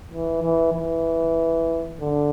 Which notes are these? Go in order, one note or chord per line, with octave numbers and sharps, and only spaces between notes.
E3
E3
E3
D3